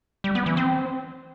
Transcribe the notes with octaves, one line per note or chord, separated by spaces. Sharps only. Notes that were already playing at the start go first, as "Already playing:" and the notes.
G3
B3
E3
C4